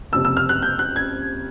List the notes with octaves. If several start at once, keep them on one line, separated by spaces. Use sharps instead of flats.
F#1 F2 C3 E6
E6
F6
F#6
G6
F#6
G#6